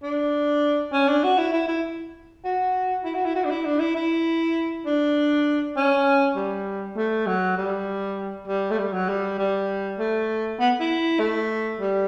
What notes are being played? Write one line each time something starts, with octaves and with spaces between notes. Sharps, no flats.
D4
C#4
D4
F#4
E4
E4
E4
F#4
E4
F#4
E4
F#4
D4
E4
D4
E4
E4
D4
C#4
G3
A3
F#3
G3
G3
A3
G3
F#3
G3
G3
A3
B3
E4
A3
G3